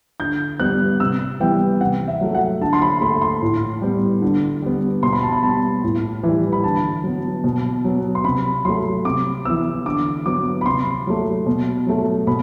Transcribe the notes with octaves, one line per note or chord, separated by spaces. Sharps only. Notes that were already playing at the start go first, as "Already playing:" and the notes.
D3 G6
G3 B3 F#6
C3 E6
E3 G3 B3 G5
C3 F#5
E5
F#3 A3
F#5
D3 A5
C6
B5
A3 C6
C6
A2
G3 B3
D3
G3 B3
B2 C6
B5
A5
B5
G3 B3 A5
A2
E3 G3
B5
D3 A5
F#3 B3
B2
F#3 B3
C6
C3 B5
F#3 A3 C6
C3 D6
E3 B3 E6
D3 D6
F#3 B3 D6
B5
C3 C6
F#3 A3
B2
F#3 A3
B2 B5